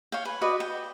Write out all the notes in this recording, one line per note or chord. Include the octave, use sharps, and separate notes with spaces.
C#5 F5 G5
B4 G#5
F#4 B4 D5 D#5
G5